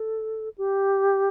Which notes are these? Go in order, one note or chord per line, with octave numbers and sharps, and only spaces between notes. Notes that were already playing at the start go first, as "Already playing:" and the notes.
Already playing: A4
G4